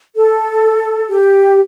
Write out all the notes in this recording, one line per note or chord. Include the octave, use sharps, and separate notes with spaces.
A4
G4